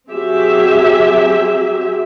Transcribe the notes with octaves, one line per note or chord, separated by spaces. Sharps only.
F#3 C4 G4 G#4 E5